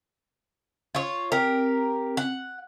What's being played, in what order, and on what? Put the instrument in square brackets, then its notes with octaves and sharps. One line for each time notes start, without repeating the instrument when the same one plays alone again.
[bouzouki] F4 C#5
[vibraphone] C4 [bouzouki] G4 A#4
[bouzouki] F#5